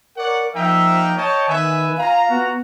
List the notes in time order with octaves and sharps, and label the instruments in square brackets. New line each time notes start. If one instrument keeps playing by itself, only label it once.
[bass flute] A#4 [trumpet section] C#5 D5 F#5
[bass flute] F3 [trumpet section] A#3 D#4 G5 [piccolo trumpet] E5
[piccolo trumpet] C#5 [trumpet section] D#5 G5 A5
[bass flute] D#3 [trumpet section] B3 B4 E5 [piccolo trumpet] G#5
[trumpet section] F4 A#5 [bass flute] F5
[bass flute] B3 [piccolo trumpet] F#4